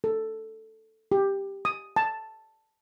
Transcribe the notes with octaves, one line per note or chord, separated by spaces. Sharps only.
A4
G4
D#6
A5